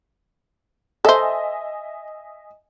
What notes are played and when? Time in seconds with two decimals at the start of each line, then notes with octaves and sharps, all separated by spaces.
1.05 A4 C5 D#5 E5 G#5